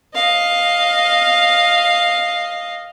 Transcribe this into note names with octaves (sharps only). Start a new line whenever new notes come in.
D#5 F5